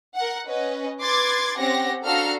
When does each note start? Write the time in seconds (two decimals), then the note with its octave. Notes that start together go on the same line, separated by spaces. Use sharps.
0.16 A#4 F#5
0.48 C#4 B4 D#5
1.03 B4 C6 D6 G#6 A6
1.59 C4 C#4 G4 F#5 A#6
2.06 D4 F#4 A4 F5 A#5 F6